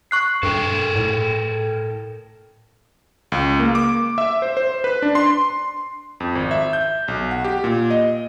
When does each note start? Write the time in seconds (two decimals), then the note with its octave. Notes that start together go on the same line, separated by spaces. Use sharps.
0.11 C#6 F#6 C7
0.43 G2 A4 A#4 G5
0.96 A2
3.32 C#2
3.59 A#3
3.75 D6
4.18 E5
4.42 C5
4.57 C5
4.84 B4
5.02 D4
5.15 C6
6.20 F2
6.35 G#1
6.51 E5
6.73 G6
7.08 B1
7.31 F#5
7.44 G4
7.64 A#2
7.91 D#5